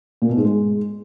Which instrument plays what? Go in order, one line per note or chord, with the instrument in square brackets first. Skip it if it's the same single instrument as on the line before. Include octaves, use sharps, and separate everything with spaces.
[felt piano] A#2
B2
G#2
G#3